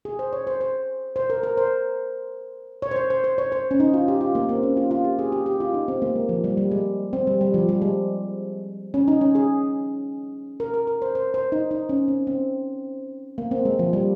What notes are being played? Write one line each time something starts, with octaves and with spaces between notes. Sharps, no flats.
G#4
C5
C#5
C5
C5
C5
A#4
A#4
C5
C#5
C5
C#5
C5
C5
C#5
C5
C#4
D#4
F4
G4
F4
A#3
C4
C#4
F4
F4
G4
G#4
G4
G4
F4
D#4
C4
A#3
G#3
F3
G3
G3
G#3
C4
G3
G3
F3
G3
G#3
C#4
D#4
C#4
G#4
A#4
A#4
A#4
C5
C5
C5
D#4
D#4
C#4
C4
C4
A#3
C4
G#3
F3
G3